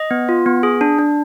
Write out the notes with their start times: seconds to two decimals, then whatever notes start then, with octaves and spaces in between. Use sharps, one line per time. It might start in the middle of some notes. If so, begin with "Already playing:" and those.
Already playing: D#5
0.11 B3
0.29 F4
0.46 B3
0.63 G#4
0.81 D4
0.98 D4